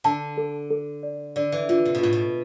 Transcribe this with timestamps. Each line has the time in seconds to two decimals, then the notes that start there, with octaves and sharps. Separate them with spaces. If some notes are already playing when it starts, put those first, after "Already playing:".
0.04 D3 A5
0.37 A4
0.70 A4
1.03 D5
1.36 D3 D5
1.52 E3
1.69 D3 F4
1.85 C3
1.95 B2
2.01 A2 F4
2.13 B2